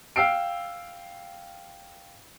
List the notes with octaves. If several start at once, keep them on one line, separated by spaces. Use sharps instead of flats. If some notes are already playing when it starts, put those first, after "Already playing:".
F5 G5 E6 C7 D7